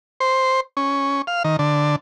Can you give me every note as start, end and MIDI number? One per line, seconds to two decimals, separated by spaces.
0.20 0.60 72
0.77 1.22 61
1.27 1.43 77
1.44 1.56 51
1.59 1.96 50